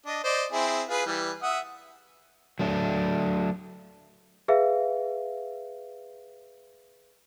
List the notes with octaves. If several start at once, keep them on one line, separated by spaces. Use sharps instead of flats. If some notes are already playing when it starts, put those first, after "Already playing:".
D4 D#5
C5 D5 D#5
C4 E4 G#4
F4 G#4 B4
E3 G3
E5 F#5 D#6
F#3 A3 D4
G#4 B4 E5 F5